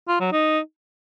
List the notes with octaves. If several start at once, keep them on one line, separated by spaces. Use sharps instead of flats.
F4
F#3
D#4